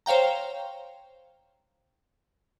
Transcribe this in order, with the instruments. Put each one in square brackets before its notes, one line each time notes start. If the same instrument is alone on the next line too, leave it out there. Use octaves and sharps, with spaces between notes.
[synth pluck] C5 C#5 F5 G5 A#5